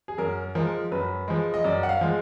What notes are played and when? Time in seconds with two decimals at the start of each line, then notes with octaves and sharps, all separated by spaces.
0.08 G#4
0.18 F#2 A#4
0.55 F3 G#3 A#4
0.92 F#2 B4
1.28 F3 G#3
1.54 D#5
1.64 F#2 D5
1.83 F#5
1.89 F5
2.01 F3 G#3